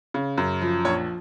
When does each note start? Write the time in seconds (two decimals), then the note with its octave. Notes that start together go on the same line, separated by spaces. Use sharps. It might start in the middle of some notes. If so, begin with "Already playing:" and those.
0.14 C#3
0.38 F#2
0.62 F3
0.85 A#1 C#5